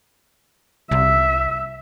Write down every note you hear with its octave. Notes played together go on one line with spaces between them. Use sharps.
C2 E5